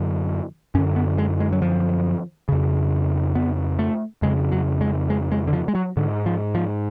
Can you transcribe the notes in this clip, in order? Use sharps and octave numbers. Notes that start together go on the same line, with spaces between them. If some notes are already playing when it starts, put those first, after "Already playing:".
Already playing: F#2 D3
F#2 D3 C#4
B3
G#3
G#3
F#3
F3
F2 C#3
B3
A3
F2 C#3 G#3
F#3
G#3
G#3
G#3
D3
F3
G#3
F#3
G#2 D3
F3
F3